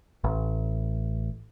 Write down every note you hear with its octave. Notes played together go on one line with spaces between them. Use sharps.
A1